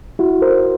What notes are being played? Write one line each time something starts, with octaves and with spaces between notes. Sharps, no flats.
E4 F#4
A#4 C5